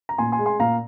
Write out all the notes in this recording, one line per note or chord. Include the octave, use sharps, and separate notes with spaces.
A#5
A#2 G#5 C6
G#5 C6
G#3
G#5 C6
A#2 F5 A#5